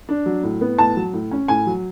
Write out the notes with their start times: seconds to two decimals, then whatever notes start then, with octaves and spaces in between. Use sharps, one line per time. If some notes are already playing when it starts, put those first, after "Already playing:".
0.09 D4
0.26 F#3
0.43 A2
0.61 B3
0.78 A2 A5
0.96 F#3
1.13 A2
1.31 C#4
1.48 A2 G#5
1.66 F#3